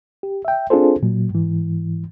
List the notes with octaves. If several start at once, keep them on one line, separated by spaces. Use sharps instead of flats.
G4
E5 G5
C4 D4 F4 G#4 A4 C5
A#2 F#3
G#2 E3